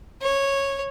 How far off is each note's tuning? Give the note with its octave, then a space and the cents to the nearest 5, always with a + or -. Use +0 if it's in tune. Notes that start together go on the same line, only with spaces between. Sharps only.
C#5 -10